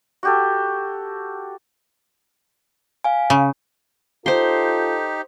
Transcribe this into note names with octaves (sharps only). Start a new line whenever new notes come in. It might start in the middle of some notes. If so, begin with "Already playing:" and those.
F#4 G4 A4
F5 G#5
C#3
D#4 F4 G4 A4 C5 C6